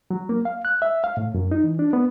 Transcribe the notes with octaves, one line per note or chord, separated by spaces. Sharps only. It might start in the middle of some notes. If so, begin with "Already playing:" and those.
F#3
A#3
F5
F#6
E5
F5
A2
F#2
D#4
E3
D4
B3